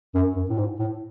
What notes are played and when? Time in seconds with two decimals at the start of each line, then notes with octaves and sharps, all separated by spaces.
0.15 F#2
0.36 F#2
0.49 A2
0.58 G#2
0.79 A2